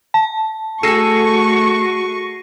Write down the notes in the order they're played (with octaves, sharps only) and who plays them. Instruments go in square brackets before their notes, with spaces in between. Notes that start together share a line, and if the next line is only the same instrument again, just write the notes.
[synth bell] A5
[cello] A3 F#4 [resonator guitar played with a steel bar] G#4 A4 [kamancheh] C#6 [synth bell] A#6 C7 D#7